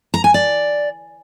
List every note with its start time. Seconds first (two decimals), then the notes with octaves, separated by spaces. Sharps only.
0.14 A#5
0.24 G#5
0.34 D5